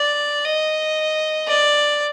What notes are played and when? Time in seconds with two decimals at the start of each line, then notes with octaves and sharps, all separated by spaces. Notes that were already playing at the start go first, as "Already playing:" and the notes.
Already playing: D5
0.44 D#5
1.48 D5